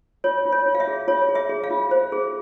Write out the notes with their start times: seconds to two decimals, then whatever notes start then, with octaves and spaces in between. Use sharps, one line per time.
0.24 F4 C#5
0.45 F4
0.52 C#5
0.66 F4
0.75 F5
0.80 E5
0.88 G#4
1.08 F4 C#5
1.29 G#4
1.35 E5
1.49 G#4
1.64 F5
1.70 F4
1.91 C5
2.12 G#4